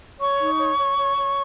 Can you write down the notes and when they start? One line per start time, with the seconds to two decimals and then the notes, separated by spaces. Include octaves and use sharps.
0.19 C#5 C#6
0.39 D#4
0.58 C#5
0.78 C#5
0.98 C#5
1.17 C#5